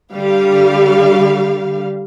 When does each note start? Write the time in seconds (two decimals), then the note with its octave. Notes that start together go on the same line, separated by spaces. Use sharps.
0.14 D3 G3 F5